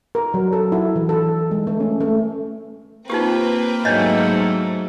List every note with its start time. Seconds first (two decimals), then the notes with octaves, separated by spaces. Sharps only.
0.15 A#4
0.34 F#3
0.52 A4
0.72 E4
0.96 E3
1.09 A4
1.51 G#3
1.67 A3
1.80 C#4
2.00 A3
3.10 A#3 C4 D#4 F4 G4 B4 G5
3.85 G#2 F#3 A3 D4 C#5 D#5